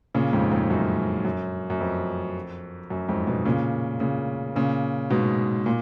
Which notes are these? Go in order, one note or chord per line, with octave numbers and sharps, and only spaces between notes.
A#2 C#3
F2 G#2
F2 G#2
F#2
F#2
F#2
F2
F#2
F2 G#2
G#2 B2
A#2 C#3
A#2 C#3
A#2 C#3
G#2 B2
A#2